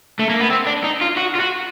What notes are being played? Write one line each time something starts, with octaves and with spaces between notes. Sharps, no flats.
A3
A#3
B3
C4
D4
D#4
F4
F#4
F4
F#4